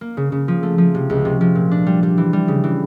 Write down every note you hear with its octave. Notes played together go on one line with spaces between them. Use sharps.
A#3
C#3
C#3
F3
A3
F3
C3
C#2
C3
F3
A#2
D4
G3
G3
E3
G3
C#3
E3